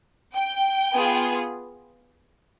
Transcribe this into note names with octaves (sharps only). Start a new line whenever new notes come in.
G5
B3 F4 G#4